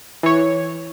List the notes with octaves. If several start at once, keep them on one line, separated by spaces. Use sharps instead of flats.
E3 C#5